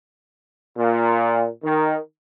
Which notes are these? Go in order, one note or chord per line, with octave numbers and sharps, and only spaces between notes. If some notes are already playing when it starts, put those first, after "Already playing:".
A#2
D#3